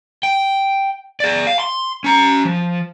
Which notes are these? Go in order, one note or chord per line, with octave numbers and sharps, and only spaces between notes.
G5
G#4 D5
F5
C6
C#4 A#5
F3